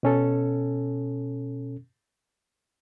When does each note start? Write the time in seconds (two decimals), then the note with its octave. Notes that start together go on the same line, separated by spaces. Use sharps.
0.03 B2 C#4 A4